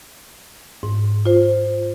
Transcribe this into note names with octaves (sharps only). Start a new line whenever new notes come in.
G#2
F4 C5